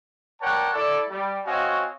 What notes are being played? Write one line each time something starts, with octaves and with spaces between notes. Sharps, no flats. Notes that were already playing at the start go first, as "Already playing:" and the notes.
A#4 C#5 D5 F#5 G5 A5
E4 A4 D5
G3
C4 F#4 C#5 D#5 F5 G#5